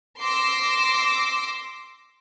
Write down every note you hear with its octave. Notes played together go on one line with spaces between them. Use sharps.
C6 D6 E6 A#6